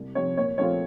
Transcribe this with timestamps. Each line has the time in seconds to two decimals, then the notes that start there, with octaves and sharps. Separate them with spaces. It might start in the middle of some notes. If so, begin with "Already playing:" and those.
Already playing: C2
0.15 C3 F3 C#5
0.37 A#2 C#5
0.58 F3 A3 C4 F4 C#5